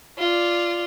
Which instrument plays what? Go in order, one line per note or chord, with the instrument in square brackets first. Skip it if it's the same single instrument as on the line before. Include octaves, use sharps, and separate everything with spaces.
[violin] F4 D5